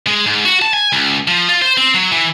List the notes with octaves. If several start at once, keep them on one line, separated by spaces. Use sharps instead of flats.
G#3
G#2
F#4
A5
G#5
C#2
F3
F4
C5
C4
F#3
E3